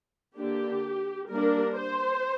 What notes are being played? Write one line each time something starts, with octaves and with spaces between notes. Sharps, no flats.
D3 A#3 D4 G4
G3 A#3 D4 A#4
C5